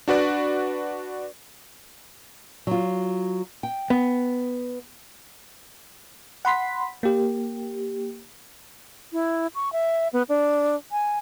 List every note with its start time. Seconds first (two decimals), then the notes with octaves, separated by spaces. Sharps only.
0.08 D4 F#4 B4 D5
2.67 F#3 F4
3.63 G5
3.90 B3
6.45 F#5 B5 C6 B6
7.03 A#3 G4
9.13 E4
9.55 C#6
9.73 E5
10.13 B3
10.29 D4
10.92 G#5